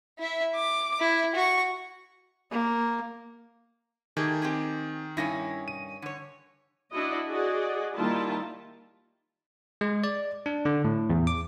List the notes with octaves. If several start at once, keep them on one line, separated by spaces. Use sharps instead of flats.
E4 E5
D6
E4
F#4 C#6
A#3
D#3 A3 G4 G#4
C4 G4 G#4
G2 D#3 C#4 E4 A#6
D#7
D3 C#5
D4 E4 F#4 D#5
F#4 G#4 D5 D#5
D#3 G3 A#3 E4 F4 A5
G#3
D5
D4
D3
A2
E2
D6